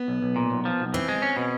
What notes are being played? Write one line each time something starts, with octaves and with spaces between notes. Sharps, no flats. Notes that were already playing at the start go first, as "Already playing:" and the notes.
Already playing: B3
B1
B1
A#2
B1
F3
B1
E3 C4
G#3
C#4
B2